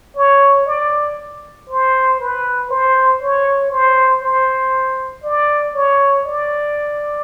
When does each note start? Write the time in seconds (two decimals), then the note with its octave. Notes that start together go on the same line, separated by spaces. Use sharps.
0.16 C#5
0.67 D5
1.69 C5
2.20 B4
2.70 C5
3.21 C#5
3.71 C5
4.23 C5
5.24 D5
5.75 C#5
6.26 D5